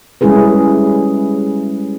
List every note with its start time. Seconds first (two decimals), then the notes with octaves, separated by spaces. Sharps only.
0.21 G3 G#3 C#4 E4 G#4 B4